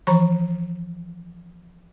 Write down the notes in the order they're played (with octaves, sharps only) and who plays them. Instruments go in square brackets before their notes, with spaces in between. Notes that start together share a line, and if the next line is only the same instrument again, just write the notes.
[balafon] E3 F3 A#5 B5 C#6